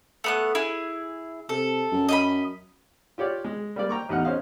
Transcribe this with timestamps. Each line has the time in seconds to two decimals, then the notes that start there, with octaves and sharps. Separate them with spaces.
0.24 A3 B3 F#6
0.55 E4 G#4
1.49 C3 A4
1.92 F#2
2.09 D#5 E5 B5
3.18 F4 G4 C#5 D5 F5
3.44 G#3
3.76 G3 A#3 D5
3.89 G5 A#5 C#6 D6
4.09 A1 E2 D#4 F#5 F6
4.25 C#4 C5 D#5 F5